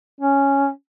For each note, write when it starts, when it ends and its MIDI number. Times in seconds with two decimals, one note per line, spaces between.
0.21 0.70 61